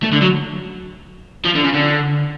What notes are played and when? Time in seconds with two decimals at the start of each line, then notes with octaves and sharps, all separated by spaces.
0.03 A3
0.12 D3
0.21 F#3
1.45 F3
1.55 D3
1.64 C#3
1.73 D3